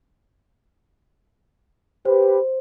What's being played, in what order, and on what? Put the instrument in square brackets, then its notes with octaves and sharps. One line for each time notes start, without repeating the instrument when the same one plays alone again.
[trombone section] G4 B4 [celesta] C5